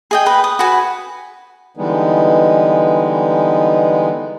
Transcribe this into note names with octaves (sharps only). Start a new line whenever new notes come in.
G#4 D#5 G5
B4 G5
D#6
F#4 B4 G#5
D3 E3 G3 G#3 B3 D#4